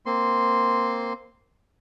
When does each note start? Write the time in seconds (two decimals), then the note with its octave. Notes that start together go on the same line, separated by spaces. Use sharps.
0.06 A#3 C4 C6